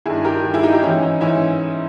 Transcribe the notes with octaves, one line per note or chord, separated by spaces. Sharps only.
G2 D#3 E4 G#4
G4 A#4
G2 D#3
E4 G#4
D#4 G4
D#4 G4
G#2 E3 C#4 E4
D#4
G#2 E3 C#4 E4